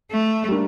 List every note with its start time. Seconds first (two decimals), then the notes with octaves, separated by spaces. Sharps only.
0.11 A3
0.49 G3 A#3 D4